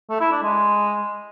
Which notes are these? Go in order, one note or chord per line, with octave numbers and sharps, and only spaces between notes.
A3
E4
D4
G#3